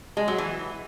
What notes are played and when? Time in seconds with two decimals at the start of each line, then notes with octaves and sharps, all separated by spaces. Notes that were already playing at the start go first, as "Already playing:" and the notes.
0.17 G#3
0.28 F#3
0.38 E3